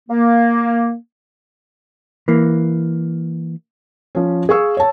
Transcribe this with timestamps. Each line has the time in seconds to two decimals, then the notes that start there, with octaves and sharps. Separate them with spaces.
0.09 A#3
2.28 E3 A#3
4.15 F3 C#4
4.49 G#4 F5 C#6 E6
4.77 C#5 A5